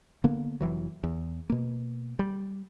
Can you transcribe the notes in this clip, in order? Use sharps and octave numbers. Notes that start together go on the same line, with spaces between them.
D3 A#3 B3
F1 E3 F#3
E2
B2 A#3
G3